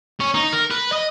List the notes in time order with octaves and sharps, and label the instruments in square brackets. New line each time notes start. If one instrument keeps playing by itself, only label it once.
[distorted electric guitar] C#4
D#4
A#4
B4
D#5